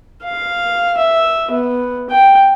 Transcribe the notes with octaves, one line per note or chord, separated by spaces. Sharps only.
F5
E5
B3
G5